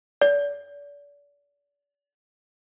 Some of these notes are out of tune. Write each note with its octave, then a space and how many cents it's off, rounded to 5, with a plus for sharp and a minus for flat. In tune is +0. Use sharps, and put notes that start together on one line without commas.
D5 -35